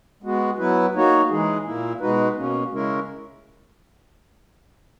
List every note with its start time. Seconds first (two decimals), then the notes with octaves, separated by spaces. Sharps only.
0.23 G#3 B3 F#4
0.58 F#3 B3 E4 B4
0.94 A#3 D#4 F#4 C#5
1.30 E3 G#3 D#4 G#4
1.65 A#2 A#3 E4
2.00 B2 G#3 D#4 F#4 B4
2.35 B2 A#3 C#4
2.71 C#3 G#3 C#4 E4 A#4